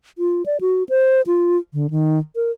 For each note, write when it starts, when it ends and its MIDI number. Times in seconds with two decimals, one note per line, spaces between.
0.18 0.45 65
0.46 0.57 74
0.61 0.83 66
0.89 1.22 72
1.27 1.57 65
1.73 1.90 50
1.90 2.19 51
2.36 2.51 70